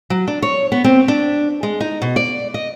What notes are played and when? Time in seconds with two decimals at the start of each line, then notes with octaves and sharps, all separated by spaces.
0.10 F#3
0.28 D4
0.42 C#5
0.72 B3
0.84 C4
1.08 D4
1.63 G#3
1.80 D#4
2.02 B2
2.16 D5
2.54 D#5